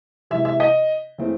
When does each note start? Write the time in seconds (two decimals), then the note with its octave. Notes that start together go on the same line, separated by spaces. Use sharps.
0.30 C3 E3 G#3 E5
0.45 E5
0.60 D#5
1.18 C#3 E3 A3 C4